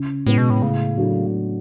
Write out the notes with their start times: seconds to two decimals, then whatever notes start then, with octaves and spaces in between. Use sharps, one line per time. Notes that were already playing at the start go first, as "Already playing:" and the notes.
Already playing: C#3
0.26 A2 G#3 B3
0.38 B2
0.50 A2
0.62 A2 C#3
0.97 F#3 A3 D4